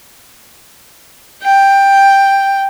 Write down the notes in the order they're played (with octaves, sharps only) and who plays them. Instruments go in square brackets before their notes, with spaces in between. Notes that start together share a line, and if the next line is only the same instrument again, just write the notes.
[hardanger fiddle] G5